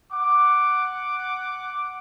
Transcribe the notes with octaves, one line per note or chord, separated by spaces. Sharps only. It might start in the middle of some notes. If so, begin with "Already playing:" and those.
F#5 D6